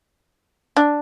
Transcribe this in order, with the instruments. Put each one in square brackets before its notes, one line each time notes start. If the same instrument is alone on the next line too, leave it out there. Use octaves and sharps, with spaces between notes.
[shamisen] D4